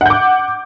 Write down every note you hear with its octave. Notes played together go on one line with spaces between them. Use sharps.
F#5 D6 G6